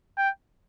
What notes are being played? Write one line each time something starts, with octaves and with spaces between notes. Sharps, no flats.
G5